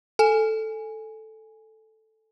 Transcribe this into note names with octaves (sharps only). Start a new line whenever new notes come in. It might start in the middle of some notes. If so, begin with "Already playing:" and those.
A4 G#5